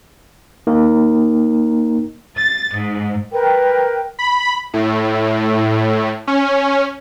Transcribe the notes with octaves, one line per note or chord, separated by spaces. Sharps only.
A#3 D#4 A#4
A6
G#2
A#4 B4 G5
B5
A2
C#4